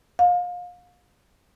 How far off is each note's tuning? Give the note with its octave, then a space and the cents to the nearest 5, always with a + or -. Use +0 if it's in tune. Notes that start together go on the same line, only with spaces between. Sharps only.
F5 +30